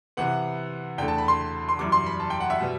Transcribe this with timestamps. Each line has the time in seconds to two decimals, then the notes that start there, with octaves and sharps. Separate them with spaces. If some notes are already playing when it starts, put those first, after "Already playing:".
0.17 C3 E3 B3 F#5
0.98 E2 D3 A3 G5
1.08 A5
1.18 B5
1.28 C6
1.69 C6
1.79 F#2 E3 G3 D6
1.92 C6
2.06 B5
2.20 A5
2.30 G5
2.40 F#5
2.50 E5
2.60 B2 G3 B3